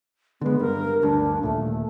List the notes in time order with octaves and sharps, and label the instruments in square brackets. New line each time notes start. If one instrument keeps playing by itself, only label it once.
[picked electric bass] D3 G#3 [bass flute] B3
[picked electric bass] G2 [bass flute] A#4
[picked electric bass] D2 G2 [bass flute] D4
[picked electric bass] D#2 A#2 [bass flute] A3